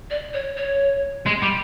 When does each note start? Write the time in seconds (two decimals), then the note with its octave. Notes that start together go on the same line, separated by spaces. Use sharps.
0.10 D5
0.34 C#5
0.57 C#5
1.27 G#3
1.43 G3